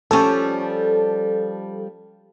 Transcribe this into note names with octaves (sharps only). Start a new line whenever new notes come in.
F3 G3 C#4 A4